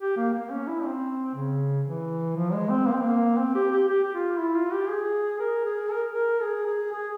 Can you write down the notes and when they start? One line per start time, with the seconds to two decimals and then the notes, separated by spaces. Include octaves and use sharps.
0.01 G4
0.17 A#3
0.34 A#3
0.50 C#4
0.67 E4
0.85 C4
1.35 C#3
1.86 E3
2.36 F3
2.53 G#3
2.70 C4
2.87 A#3
2.94 C4
3.02 A#3
3.38 C4
3.55 G4
3.72 G4
3.88 G4
4.03 G4
4.14 F4
4.39 E4
4.55 F4
4.73 G4
4.89 G#4
5.40 A#4
5.65 G#4
5.91 A#4
6.12 A#4
6.42 G#4
6.67 G#4
6.93 G#4